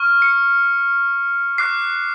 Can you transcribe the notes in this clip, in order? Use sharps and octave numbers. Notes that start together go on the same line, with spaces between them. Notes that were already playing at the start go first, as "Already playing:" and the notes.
Already playing: C#6 F6
C#7
D6 F#6 C7